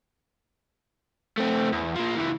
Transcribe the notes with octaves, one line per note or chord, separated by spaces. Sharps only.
A3 C4
E2
F3 A#3
C#2 E3